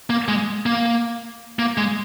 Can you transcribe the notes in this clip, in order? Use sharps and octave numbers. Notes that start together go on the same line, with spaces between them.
A#3
G#3
A#3
A#3
G#3